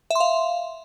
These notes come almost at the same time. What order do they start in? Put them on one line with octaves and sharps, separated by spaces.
E5 C6 F5